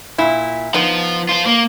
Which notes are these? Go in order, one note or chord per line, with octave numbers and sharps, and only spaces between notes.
A#2 E4
F3 B3 D#4
F4 C5
A#3